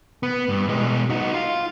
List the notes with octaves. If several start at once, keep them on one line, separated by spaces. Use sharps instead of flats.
B3
G2
B2 G#3
D#4 F#4
F4